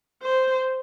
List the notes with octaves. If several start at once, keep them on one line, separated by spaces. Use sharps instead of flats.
C5